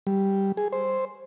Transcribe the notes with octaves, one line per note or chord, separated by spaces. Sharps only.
G3
G#4
C5